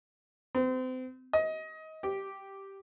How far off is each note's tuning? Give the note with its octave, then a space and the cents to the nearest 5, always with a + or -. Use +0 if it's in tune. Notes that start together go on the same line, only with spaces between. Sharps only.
C4 -35
D#5 +25
G4 -5